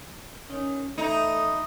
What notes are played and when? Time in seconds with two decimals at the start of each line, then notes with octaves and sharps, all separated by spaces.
0.50 D#3 C#4
0.98 E2 A3 D#4 E4